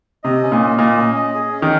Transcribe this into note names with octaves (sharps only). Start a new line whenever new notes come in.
C3 D#5
C#4
A#2
D#5
A#2 D#5
C#4
D#5
G#4
C#4
D#3